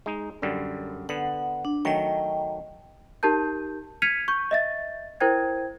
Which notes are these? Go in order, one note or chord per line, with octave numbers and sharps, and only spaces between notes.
G#3 D#4
F#2 D3 G3
D3 B3 F#5
D4
D#3 F#3 A3 D#5 G5
D#4 G4 A#4 A5 G6
F6 G#6 B6 C#7 D#7 F7
C#6 G6
D#5 E5 A6
E4 A#4 C5 G5 G#6